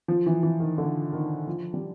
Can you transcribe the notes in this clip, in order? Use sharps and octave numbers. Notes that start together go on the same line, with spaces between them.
F3
E3
E3
D#3
D3
D#3
F3
G3